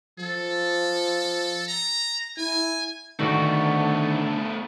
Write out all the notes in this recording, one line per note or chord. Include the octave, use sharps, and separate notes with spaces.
F3 A4
A#5
E4 G#5
D3 D#3 A3 B3 F#4